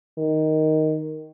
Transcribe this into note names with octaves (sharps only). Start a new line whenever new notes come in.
D#3